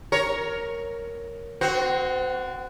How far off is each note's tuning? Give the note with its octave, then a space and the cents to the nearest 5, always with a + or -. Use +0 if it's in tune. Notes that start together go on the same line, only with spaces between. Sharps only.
A#4 +0 C#5 +0
C4 -35 F#4 +0 C5 +0